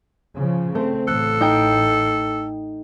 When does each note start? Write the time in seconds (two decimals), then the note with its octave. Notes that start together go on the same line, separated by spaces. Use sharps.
0.36 C#3 F3
0.75 A3 C4
1.08 A1 A4 F#6
1.41 D#4 G5